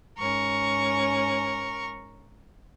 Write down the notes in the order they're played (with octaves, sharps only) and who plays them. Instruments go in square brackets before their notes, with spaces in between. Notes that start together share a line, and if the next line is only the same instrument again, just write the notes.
[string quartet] G#2 C#4 [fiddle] A#4 C#6